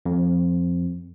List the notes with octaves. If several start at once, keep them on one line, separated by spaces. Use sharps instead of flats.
F2